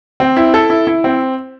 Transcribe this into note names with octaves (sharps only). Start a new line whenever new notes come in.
C4
E4
A4
E4
E4
C4